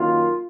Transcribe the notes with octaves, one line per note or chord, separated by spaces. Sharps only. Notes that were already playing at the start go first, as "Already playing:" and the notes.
Already playing: F#2 D#3 A#3 F4